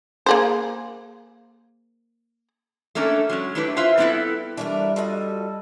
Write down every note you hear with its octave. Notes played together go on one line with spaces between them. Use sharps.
A#3 G#4 C5
A3 A#3 C#4 D4 A4
F#3 G#3 C#4
A3 D4 E4 G4 A#4 B4
E4 F4 B4 C5 E5 F5
G3 B3 C4 E4 A4 B4
E3 G3 A3 D4 A#4
F4 F#4 A4 D#5